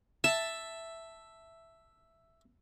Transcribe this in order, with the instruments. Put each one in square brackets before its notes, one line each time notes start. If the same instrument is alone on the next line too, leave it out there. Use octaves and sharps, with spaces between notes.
[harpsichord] E5 [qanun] A5